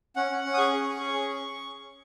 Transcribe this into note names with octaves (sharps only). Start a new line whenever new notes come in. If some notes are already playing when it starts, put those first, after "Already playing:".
C#4 F#5
C#4
C#4
D#6
G#4 C#6
G#4
C#4
G#4
C#4
C#4